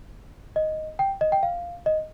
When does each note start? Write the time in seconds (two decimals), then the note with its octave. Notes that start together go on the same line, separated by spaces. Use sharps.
0.56 D#5
0.99 G5
1.21 D#5
1.32 G5
1.43 F5
1.86 D#5